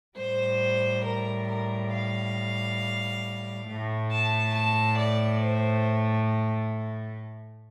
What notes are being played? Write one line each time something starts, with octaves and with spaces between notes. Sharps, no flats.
A2 G3 C5
A#4
A#4
F5
A2 A3
A5
A5
D5
C5